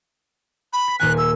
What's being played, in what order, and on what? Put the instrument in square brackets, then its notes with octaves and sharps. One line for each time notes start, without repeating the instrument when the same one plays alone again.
[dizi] B5
[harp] B6
[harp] D#1 A#3 G#5 [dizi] F#6
[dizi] E6